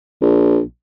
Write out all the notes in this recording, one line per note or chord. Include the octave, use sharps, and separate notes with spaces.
A#1